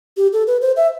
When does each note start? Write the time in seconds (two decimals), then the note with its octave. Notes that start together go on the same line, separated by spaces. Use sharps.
0.17 G4
0.33 A4
0.47 B4
0.62 C5
0.76 E5